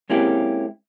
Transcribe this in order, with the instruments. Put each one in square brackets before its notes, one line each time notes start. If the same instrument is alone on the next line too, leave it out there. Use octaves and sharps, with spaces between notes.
[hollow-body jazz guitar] G#3 A#3 C4 C#4 E4 G4